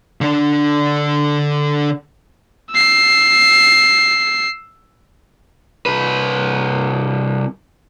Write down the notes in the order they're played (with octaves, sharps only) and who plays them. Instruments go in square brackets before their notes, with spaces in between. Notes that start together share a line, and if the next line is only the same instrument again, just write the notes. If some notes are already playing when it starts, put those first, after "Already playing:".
[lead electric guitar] D3 D4
[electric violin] E6 C7
[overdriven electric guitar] C2 B4